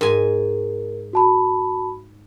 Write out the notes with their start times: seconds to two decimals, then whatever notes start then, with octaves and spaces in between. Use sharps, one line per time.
0.01 G#2 A#4 G#5
1.13 F#4 A5 B5